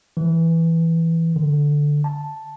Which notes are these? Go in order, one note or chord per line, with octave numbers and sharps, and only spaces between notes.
E3
D3
A5